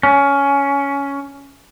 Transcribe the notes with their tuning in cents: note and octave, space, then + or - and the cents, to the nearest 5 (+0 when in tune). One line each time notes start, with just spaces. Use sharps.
C#4 +15